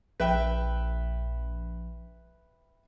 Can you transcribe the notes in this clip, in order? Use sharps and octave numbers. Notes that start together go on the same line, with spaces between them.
A#1 B4 E5 G5